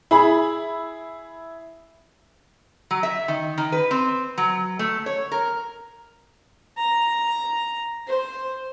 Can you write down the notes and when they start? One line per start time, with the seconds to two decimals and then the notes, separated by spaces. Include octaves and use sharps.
0.11 E4 G#4 B5
2.91 F#3
3.03 E5
3.28 D#3
3.58 D#3
3.72 B4
3.91 C4
4.38 F#3
4.79 A3
5.06 C#5
5.32 A#4
6.78 A#5
8.07 C5